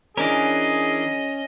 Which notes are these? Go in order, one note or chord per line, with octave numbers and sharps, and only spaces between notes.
E3 C#4 D4 G#4 A#4 D#5